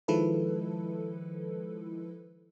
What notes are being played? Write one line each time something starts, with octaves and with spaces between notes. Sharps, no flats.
D#3 F3 G#3 E4 A4 B4